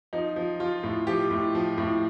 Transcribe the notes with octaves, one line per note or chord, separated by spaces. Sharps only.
F3 D#4
F3
F3 F4
A2
F3 G4
A2
F3
A2